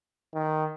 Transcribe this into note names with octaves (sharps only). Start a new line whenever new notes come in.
D#3